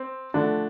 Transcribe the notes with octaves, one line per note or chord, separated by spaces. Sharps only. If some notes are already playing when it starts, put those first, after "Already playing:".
Already playing: C4
D3 F3 A3 D4